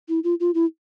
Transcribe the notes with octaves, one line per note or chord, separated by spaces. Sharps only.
E4
F4
F4
E4